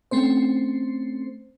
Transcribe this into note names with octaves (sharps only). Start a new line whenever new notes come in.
A3 C4 C#4 C5